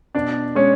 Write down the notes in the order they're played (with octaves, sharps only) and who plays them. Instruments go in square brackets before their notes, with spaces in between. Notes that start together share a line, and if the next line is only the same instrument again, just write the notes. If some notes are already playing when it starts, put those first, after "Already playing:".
[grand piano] B2 D4 D5
G#3 C#4 C#5